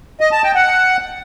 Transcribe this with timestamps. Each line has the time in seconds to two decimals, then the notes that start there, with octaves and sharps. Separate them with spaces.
0.21 D#5
0.32 A5
0.44 G5
0.55 F#5